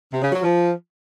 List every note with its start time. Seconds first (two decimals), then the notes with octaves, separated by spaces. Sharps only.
0.11 C3
0.22 C#3
0.32 F#3
0.43 F3